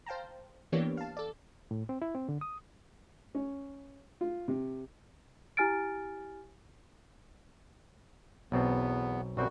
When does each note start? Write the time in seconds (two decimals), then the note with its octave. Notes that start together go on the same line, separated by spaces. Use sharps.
0.06 C5 F5 G5 A5 A#5
0.72 E3 A#3 B3 D4 G4 C#5
0.97 F5 A5
1.17 A4 D5
1.71 A2
1.89 C4
2.02 E4
2.15 C4
2.29 D3
2.41 D#6
3.35 C#4
4.21 F4
4.48 C3
5.57 E4 G4 G#5 F6 A6 D7
8.52 B1 E2 B2 B3 C4
9.37 B1 F#2 G3 C4 F#4 G5